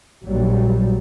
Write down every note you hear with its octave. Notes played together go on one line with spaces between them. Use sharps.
A#1 F#3 G3